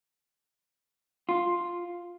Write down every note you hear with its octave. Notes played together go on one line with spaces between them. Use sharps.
F4